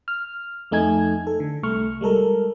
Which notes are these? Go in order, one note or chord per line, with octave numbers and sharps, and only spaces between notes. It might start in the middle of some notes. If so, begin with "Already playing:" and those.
F6
F2 A3 D#4 G#5 G#6
A4
D3
C2 A3 C#6 F6
G3 G#3 A4 A#4